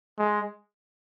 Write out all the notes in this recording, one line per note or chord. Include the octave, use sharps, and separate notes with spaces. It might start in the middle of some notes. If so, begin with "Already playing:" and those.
G#3